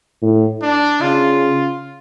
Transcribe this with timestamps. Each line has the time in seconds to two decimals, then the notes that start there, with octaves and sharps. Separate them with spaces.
0.22 A2
0.62 D4
1.01 C#3 F4